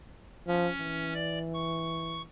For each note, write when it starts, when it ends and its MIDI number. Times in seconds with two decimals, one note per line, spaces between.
0.47 0.69 53
0.47 1.13 61
0.79 2.27 52
1.14 1.39 74
1.54 2.22 85